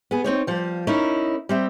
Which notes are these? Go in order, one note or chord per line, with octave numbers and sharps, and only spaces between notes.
B3 G#4
C4 D#4 C#5
F3 G3
C#4 D#4 E4 A#4
G3 C4 E5